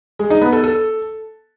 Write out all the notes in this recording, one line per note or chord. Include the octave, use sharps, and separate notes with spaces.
G#3
D#4
B3
A4
A4